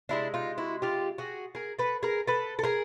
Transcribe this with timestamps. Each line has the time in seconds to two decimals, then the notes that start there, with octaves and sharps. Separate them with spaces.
0.09 C3 F3 G#3 D4 E4
0.34 D#4 F4
0.58 E4 F#4
0.82 F4 G4
1.18 F#4 G#4
1.55 G#4 A#4
1.79 A4 B4
2.03 G#4 A#4
2.27 A4 B4
2.59 A4
2.63 G#4 A#4